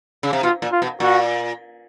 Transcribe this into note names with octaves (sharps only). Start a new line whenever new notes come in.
C#3
C3
B2 F4
A#2
F4
B2
A#2 F#4